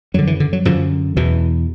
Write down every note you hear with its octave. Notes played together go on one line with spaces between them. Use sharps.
F#2 D3 F#3
E3
D3
F#3
F#2 D3 F3
E2 B2 E3